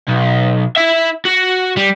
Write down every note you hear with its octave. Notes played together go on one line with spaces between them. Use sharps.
B1
E4 E5
F#4
G3